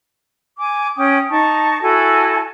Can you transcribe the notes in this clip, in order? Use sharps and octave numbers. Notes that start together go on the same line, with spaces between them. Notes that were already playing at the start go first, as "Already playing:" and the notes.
G#5 D6
C#4 G5 D#6
D#4 A5 C#6
E4 F#4 A4 G#5